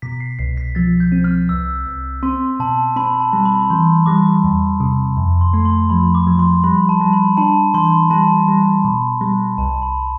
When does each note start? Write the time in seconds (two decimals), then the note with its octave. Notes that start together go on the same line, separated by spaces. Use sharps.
0.02 B2 B6
0.20 C7
0.39 C2 C7
0.57 B6
0.75 F3 A6
1.00 G6
1.12 C4
1.24 F6
1.49 C2 E6
1.86 C2
2.23 C4 C6
2.60 B2 A5
2.96 C4 B5
3.20 A5
3.33 G3
3.45 B5
3.70 E3 C6
4.06 G3 D6
4.44 E2
4.80 C3
5.17 F2
5.41 C6
5.53 A3
5.65 C6
5.90 F3 B5
6.15 D6
6.27 F3
6.39 C6
6.64 G3 B5
6.89 A5
7.01 G3
7.13 B5
7.37 D4 A5
7.74 E3 C6
7.93 B5
8.10 G3 A5
8.48 G3
8.85 B2 B5
9.21 G3
9.58 C2 A5
9.82 B5